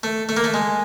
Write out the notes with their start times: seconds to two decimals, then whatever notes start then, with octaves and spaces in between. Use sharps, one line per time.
0.03 A3
0.29 A3
0.37 A#3
0.44 A3
0.54 G#3